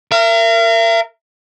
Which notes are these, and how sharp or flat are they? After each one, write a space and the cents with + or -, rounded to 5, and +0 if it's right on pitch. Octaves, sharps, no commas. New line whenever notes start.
A#4 -15 E5 +40